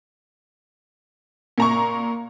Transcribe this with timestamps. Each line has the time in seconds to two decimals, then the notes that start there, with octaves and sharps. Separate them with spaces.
1.58 A#2 A#5 C#6